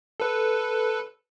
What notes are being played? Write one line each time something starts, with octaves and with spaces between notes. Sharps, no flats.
A4 B4